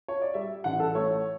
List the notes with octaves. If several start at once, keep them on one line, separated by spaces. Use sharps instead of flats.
C#5
D5
G3 E5
A1 F#5
A4
A3 C#5